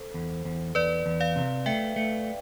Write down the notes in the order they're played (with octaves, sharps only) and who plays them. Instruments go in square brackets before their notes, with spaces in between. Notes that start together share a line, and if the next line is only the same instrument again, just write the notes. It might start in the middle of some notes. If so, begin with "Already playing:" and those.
Already playing: [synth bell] A4 C5
[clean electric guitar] E2
E2
[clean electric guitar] E2 [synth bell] B4 D5
[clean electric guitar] E2
[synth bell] D5 F5
[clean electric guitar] C3
[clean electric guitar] A3 [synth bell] E5 G5
[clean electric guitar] A3